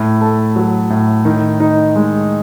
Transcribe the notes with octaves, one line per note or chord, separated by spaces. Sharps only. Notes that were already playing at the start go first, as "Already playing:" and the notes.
Already playing: A2
A3
F#3
A2
D#3
D#4
G#3